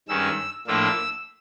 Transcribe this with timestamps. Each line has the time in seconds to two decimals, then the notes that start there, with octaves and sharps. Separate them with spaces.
0.08 G2 D#3 G#3 C#4 E6
0.67 A2 F3 A#3 D4 F4 E6